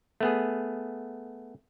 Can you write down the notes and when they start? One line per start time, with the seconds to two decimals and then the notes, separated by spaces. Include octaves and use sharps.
0.20 A3 B3 G#4